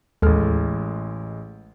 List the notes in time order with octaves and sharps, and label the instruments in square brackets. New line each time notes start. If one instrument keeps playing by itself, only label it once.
[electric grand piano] A1 G#3 [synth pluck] D#2 A4 F6